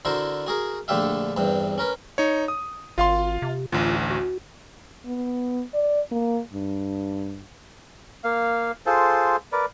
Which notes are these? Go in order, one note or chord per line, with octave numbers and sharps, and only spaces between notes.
D3 E4 F#4 A#4 C5
F#4 G#4 A#4
A#1 D3 A3 G4 E5 F5
E2 G2 C3
C#4 A#4 B4
D#4 C#5
D#6
G#1 F4 F5 C6
C3
A1 D2 F4
F#4
B3
D5
A#3
G2
A#3 F5
F4 G#4 A4 C5
A#4 B4 D5